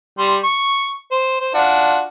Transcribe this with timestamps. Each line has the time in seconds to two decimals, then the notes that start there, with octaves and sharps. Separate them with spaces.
0.18 G3 C6
0.44 C#6
1.11 C5
1.40 C5
1.54 D4 F4 F#4